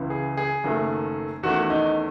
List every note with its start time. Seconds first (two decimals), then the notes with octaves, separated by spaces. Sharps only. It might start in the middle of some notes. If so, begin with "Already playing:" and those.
Already playing: C#2 C#3 E3
0.10 G#4
0.37 G#4
0.64 F#1 F#2 D#3 A3
1.43 E2 D#3 A3 C#4 F#4
1.70 D#4